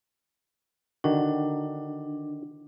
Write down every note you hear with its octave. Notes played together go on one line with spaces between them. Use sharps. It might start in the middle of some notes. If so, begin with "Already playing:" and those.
D3 D#3 D4 F#4